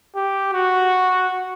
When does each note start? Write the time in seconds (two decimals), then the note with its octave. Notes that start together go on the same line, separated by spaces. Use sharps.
0.15 G4
0.53 F#4